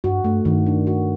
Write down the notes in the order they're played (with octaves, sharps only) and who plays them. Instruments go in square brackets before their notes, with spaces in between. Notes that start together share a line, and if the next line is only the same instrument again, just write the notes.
[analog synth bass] G2 [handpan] F#4
[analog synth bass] G2 [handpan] A3
[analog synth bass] G2 [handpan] D#3
[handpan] D4
F#4